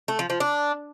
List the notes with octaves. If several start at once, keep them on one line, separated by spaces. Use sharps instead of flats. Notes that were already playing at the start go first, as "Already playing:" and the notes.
A3
F3
F3
D4